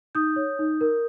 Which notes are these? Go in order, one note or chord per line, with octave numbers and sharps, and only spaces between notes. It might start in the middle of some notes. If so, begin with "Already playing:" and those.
D#4 D#6 G6
C#5
D#4
A#4